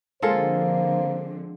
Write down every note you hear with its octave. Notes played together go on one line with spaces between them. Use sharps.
D3 F3 G#3 A#3 C4 F4 A4 C5